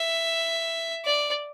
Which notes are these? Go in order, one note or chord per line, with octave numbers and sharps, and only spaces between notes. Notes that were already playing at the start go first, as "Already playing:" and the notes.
Already playing: E5
D5